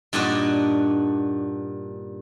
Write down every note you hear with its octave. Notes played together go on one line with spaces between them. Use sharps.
G2 A#2 D4 D#4 F#4